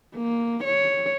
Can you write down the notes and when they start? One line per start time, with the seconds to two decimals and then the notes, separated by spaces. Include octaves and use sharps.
0.15 A#3
0.64 C#5